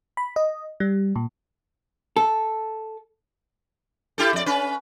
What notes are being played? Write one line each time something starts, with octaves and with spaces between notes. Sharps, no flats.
B5
D#5
G3
A#2
A4
E4 G4 A4
F2 D5
C#4 B4